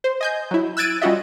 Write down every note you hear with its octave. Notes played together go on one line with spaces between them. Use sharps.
C5
D#5 G#5 G6
F#3 E4
E6 F#6 G#6 A6 D7 D#7
G3 C#4 F4 F#4 D#5 E5